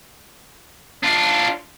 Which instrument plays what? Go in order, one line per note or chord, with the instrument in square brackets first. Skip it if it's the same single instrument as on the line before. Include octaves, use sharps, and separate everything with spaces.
[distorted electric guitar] D4 F4